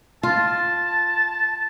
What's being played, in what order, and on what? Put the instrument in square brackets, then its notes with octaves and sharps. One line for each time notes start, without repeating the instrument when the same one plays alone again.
[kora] F4 [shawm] A5